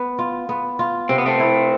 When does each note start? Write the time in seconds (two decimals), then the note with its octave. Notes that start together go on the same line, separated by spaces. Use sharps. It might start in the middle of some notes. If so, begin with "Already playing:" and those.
Already playing: B3
0.19 F4
0.49 B3
0.79 F4
1.09 C3 C4
1.18 B3
1.26 A3 C4
1.40 E4